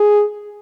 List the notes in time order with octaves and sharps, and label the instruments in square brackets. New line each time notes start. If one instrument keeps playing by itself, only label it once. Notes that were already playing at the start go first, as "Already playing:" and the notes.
Already playing: [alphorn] G#4